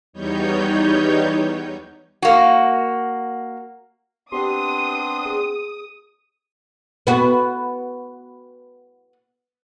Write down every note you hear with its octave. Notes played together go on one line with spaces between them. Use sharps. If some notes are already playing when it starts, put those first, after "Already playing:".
E2 G3 B3 D#4 C#5 G6
A#3 F#4
B3 C4 D4 G4 C6 D#6
G#4
B3 F#4